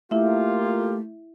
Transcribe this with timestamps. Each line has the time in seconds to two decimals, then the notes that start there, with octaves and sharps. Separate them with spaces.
0.11 A3 A#3 E4 F4 G4 E5